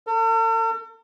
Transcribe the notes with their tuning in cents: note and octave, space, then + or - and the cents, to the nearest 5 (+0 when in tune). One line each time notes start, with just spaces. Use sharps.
A4 +45